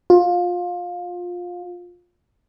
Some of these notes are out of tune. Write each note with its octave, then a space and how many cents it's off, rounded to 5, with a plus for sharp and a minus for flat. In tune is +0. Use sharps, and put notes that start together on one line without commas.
F4 +20